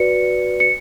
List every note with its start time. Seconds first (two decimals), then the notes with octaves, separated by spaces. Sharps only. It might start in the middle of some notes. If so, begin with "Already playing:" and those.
Already playing: F#4 B4 D5 C#7
0.60 C#7